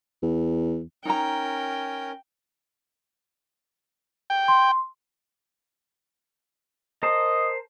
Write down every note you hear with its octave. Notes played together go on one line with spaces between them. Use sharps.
E2
C#4 D#4 A#4 G5 A#5
G5
C6
A#4 C5 D#5 A5